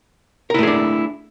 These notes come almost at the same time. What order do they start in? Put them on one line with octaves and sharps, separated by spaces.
A#4 E4 A3 G#4 D4